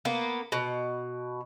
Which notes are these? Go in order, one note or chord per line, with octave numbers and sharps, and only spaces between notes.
A#3 B3
B2